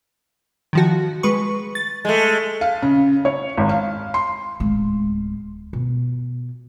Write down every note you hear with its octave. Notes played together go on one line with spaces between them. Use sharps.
D#3 F3 F#4
G#3 B4 C#6
A6
G#3 A3
F5
C#3
C#5
G#1
F5
C6
D1 G#3
B2